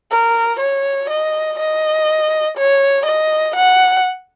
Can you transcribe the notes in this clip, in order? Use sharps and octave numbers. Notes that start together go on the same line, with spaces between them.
A#4
C#5
D#5
D#5
C#5
D#5
F#5